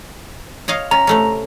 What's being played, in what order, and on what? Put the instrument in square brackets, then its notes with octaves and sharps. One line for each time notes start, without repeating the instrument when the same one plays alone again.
[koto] C#5 D#5 F5
[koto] C#4 [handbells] A#5
[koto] C3 A3 C#4